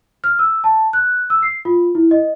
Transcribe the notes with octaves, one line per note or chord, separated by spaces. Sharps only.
F6
E6
A5
F#6
E6
C7
F4
E4
D#5